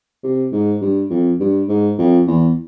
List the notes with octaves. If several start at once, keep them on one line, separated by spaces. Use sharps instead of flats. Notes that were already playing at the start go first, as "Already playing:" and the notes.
C3
G#2
G2
F2
G2
G#2
F2
E2